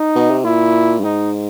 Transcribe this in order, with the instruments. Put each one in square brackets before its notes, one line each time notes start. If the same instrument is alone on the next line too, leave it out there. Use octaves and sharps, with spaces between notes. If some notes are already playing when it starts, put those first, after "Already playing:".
Already playing: [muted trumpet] D#4
[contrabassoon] B2
C3
[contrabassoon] A#2 [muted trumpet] E4
[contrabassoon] G2
[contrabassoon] G#2 [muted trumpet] D#4